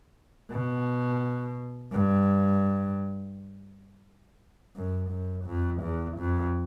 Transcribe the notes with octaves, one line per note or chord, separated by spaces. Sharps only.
B2
G2
F#2
F#2
F2
E2
F2